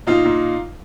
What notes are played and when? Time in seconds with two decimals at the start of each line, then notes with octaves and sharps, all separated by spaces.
0.07 A#2 D#4 F4
0.25 A#2